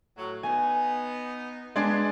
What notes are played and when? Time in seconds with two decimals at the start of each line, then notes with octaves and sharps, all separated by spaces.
0.16 A2 F#3
0.43 B3 D#4 G#5
1.76 G#3 B3 D4 G#4